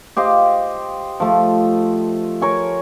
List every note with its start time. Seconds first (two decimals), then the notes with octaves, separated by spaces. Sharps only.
0.17 G4 C5 D#5 F5
1.20 F3 A3
2.42 A#4 C#5 G#5